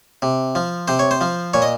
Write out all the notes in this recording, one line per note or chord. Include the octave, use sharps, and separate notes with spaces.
C3
F3
C3 C5
C#5
C5
F3
A#2 C#5
D#5